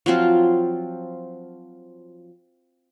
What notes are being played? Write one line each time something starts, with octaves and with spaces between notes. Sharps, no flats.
F3 F#3 C4 F4